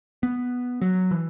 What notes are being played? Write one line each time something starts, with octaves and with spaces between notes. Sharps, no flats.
B3
F#3
E3